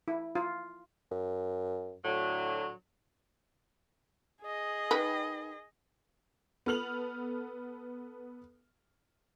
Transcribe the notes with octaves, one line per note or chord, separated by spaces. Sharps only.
E4
F4
F#2
A2 D3 F#3
G#4 D#5
D#3 B4
B3 A4 F6 F7 F#7